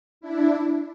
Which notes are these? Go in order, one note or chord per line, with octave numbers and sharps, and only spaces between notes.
D4 E4